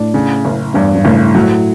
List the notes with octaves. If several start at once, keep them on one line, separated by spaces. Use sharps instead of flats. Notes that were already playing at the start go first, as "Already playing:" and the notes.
Already playing: A2 D4
C#3
F#1
E2 G2
G2
F#1 A2
A2 F#3